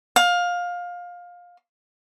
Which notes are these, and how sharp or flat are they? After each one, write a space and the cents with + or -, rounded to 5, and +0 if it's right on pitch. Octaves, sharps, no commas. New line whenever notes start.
F5 +20